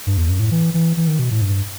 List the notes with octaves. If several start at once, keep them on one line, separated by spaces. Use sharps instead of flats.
G2
E2
F#2
A2
E3
E3
E3
D#3
B2
A2
G2